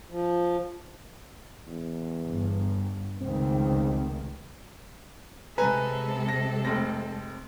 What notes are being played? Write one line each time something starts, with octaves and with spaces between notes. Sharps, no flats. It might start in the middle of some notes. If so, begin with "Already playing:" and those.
F3
E2
G1
F1 C#2 D#3 C4
C3 G#3 A4 B4 G#5 A#5
A#6
F1 C4 A#6